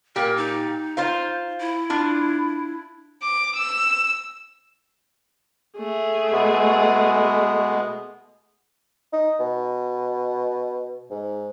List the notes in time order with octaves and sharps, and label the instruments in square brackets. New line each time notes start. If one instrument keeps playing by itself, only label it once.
[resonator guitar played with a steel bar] A#2 G4 [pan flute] A#4
[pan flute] D#4
[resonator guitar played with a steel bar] F4 C5 F5
[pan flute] E4
[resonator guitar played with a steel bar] D4 F4
[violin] D6
E6
[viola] A3 G#4
[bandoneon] B2 G#3 B3
[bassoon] D#4
B2
G#2